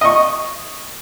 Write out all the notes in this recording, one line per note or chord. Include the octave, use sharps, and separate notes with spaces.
D#5 C#6